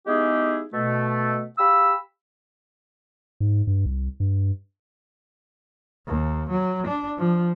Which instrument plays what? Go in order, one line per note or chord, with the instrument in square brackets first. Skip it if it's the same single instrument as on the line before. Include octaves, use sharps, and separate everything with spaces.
[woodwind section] G#3 B3 D#4 E4 G4 G#4
B2 A3
G4 F5 B5 E6
[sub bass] G#2
G2
C2
G2
[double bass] D#2
F#3
D4
F3